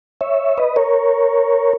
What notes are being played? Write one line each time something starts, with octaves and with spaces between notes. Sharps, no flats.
C#5 E5
B4 D#5
A#4 C#5